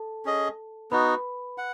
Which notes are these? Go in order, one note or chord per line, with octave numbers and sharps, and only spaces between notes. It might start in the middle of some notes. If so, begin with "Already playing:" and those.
Already playing: A4 A5
C#4 G#4 D#5
B3 D#4 F#4 B4 B5
F#5